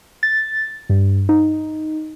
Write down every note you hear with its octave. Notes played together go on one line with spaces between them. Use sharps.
A6
G2
D#4